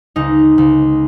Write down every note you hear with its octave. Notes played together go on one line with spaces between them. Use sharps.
C#2 D#4
C#2